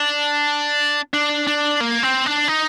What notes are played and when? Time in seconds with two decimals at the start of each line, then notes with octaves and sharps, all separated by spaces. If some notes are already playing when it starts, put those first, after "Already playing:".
Already playing: D4
1.14 D4
1.47 D4
1.80 A#3
2.03 C4
2.26 D4
2.48 D#4